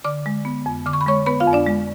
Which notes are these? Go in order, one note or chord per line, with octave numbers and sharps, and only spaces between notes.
D3 D5 D6
G#3
B3
F2
D3 D6
C#6
B5
G#3 C#5 C#6
B3 B4 B5
F4 F5
F2
D4 D5
G#3